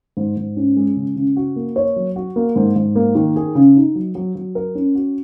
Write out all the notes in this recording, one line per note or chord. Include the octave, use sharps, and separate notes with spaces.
G#2
G#2
C#4
G#3
C#3
C#3
F#4
A#3
C#5
F#3
F#4
A#3
G#2
G#2
A#3
D#3
G#4
C#3
D#4
F#3
F#3
F#3
A#4
C#4
F#4